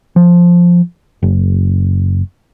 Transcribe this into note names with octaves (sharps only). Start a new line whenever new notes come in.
F3
F#1